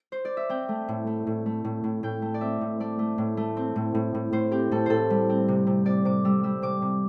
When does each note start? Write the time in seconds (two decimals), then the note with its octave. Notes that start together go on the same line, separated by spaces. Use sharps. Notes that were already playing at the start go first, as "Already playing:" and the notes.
Already playing: A4
0.12 C5
0.25 D5
0.37 E5
0.49 C4 G5
0.69 A3
0.88 A2
1.07 A3
1.27 A2
1.46 A3
1.64 A2
1.84 A2
2.03 A2 G5
2.22 A3
2.34 D5
2.41 C4 E5
2.61 A2
2.80 A3 D5
2.99 A3
3.18 A2
3.37 A3
3.57 C4
3.76 A2
3.95 A2
4.14 A2
4.32 A2 C5
4.51 C4 G4
4.71 A2 A4
4.86 A2 A4 C5
5.10 G3
5.29 C4
5.48 C3
5.67 C3
5.86 C3 D5
6.05 C3 D6
6.25 G3 E6
6.44 G3 E6
6.62 C3 D6
6.82 C3